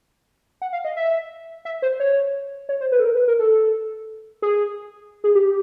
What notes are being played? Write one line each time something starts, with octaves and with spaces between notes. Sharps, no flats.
F#5
F5
D#5
E5
E5
C5
C#5
C#5
C5
B4
A4
A#4
B4
A#4
A4
G#4
G#4
G4